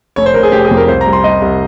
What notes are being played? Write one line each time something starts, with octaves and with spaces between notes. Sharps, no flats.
F1 C#5
C5
F1 A#4
G#4
F1 G4
G#4
F2
A#4
C2 C5
A#5
G3
C6
G3 D#5
C2